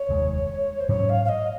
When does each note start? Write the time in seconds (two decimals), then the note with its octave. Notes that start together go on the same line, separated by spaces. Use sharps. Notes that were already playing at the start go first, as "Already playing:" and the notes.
Already playing: C#5
0.09 F1 D#2 D#3 G#3
0.80 C5
0.89 G#2 F#3 C#4 C#5
1.09 F5
1.25 F5
1.28 D#5